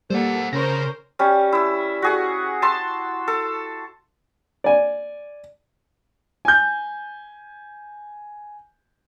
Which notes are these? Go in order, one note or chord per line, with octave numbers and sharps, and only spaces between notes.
G3 A#3 A4 C5 F#5
C#3 C#4 A#4 C5 C6 A#6
G3 C#4
E4 E6
F#4 G#4 F#5
A5 C6 E6
A4
D5 G#5
G#5 G6